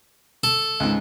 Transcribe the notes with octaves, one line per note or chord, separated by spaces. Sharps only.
A4
C#2 G#2